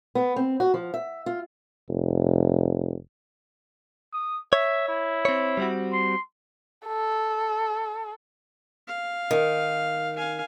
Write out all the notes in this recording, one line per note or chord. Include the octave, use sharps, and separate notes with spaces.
B3
C4
F#4
F3
E5
F4
F1
D#6
C#5 E5
E4
C4 C#5
G3 C4 F#4
C6
A4
F5
D#3
F5 G#5